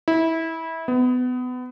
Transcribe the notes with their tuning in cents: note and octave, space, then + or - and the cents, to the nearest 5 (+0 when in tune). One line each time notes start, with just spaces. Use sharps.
E4 -20
B3 +25